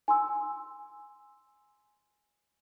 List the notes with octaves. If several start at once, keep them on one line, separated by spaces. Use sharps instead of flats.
G#5 C6 E6